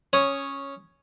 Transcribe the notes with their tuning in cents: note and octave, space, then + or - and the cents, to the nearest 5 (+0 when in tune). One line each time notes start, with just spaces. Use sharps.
C#4 -5 C#5 +0 D#6 +0